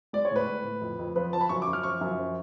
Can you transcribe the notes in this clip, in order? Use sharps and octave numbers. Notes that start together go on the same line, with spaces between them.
G#3 D5
C#5
A2 B4
A2
A2
F2
F2
F3 B4
F3 A5
B5
F#2 C#6
D6
F#2
F6
F3 C#6
F#2
F3